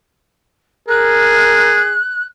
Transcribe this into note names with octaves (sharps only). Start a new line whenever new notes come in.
G#4 A#4 F#6